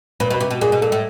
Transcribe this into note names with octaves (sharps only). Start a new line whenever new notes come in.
A#2 B4
B2 B4
C3
B2
A#2 G#4
B2
A#2 A4
A2